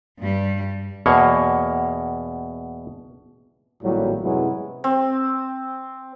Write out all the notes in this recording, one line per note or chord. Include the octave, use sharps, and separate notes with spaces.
G2 G3
E2 B2 A#3 C#5
G#1 A2 F#3 G3 A#3 F#4
F#2 C3 F#3 G#3 B3 E4
C4